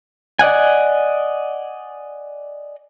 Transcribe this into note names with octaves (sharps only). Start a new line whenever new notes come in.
D5 D#5 F#5 G#5